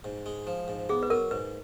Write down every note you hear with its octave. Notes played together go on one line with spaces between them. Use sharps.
G#2
G#3
F3
G#2
B3 G#4
B4
F#3 A#4
G#2 B4